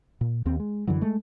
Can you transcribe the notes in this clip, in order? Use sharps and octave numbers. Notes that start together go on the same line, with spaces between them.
A#2
D#2 C4
G#3
F#2 D3 E3 F#3
G#3 A3